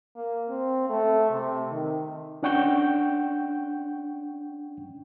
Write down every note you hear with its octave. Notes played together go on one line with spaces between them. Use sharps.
A#3
C4
A3
C3
D#3
C#4 D4 F#5 G5 C#6 G6